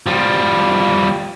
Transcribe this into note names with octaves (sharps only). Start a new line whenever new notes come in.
F3 G3